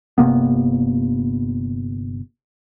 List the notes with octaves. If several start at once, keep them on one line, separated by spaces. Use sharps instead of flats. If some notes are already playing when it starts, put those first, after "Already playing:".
G1 C3 A#3 B3